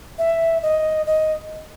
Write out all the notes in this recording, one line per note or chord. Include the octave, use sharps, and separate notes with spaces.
E5
D#5
D#5